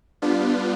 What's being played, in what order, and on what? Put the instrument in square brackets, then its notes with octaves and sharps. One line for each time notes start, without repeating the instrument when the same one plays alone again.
[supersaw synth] G3 B3 D4 F4